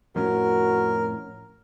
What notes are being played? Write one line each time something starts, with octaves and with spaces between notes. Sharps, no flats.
F2 A2 C#4 F#4 A#4